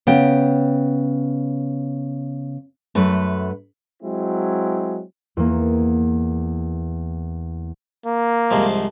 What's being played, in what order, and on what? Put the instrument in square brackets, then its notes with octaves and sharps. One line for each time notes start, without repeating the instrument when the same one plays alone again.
[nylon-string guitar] C#3 B3 G5
[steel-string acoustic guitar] F#2 A3 B4
[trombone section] F#3 G#3 C4 E4
[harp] E2 A#3
[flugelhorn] A#3
[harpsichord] C2 G#2 F3